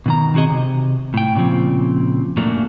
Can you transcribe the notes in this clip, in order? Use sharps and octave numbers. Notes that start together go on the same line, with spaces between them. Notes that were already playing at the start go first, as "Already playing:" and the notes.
B2 D#3 A#5
D#3 C4 F#4 G#4 D#5
C3
A2 G5
A#2 C#3 E3 F3 C4
F#2 A#2 F#3 A3 A#3 D4